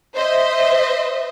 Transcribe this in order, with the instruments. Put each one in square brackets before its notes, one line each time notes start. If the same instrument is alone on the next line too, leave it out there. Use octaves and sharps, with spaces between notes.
[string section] C5 D#5 E5